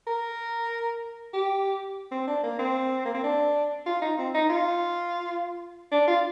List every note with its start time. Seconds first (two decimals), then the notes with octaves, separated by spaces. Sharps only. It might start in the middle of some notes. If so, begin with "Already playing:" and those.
0.07 A#4
1.33 G4
2.12 C4
2.27 D4
2.43 A#3
2.59 C4
3.05 A#3
3.14 C4
3.23 D4
3.86 F4
4.02 D#4
4.18 C4
4.34 D#4
4.49 F4
5.92 D4
6.07 F4